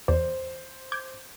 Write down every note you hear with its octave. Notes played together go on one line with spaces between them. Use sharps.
E2 C5 D5
D6 G6 G#6